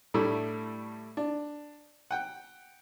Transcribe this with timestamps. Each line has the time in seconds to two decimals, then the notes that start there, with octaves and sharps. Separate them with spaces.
0.14 A2 G3 A3 D4 E4
1.17 D4
2.11 F#5 G5